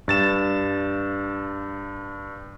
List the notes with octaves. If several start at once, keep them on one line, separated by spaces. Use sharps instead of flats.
G2 A6 E7